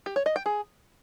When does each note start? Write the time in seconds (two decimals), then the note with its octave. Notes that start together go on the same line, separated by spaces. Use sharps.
0.06 G4
0.16 C#5
0.26 D#5
0.36 G5
0.46 G#4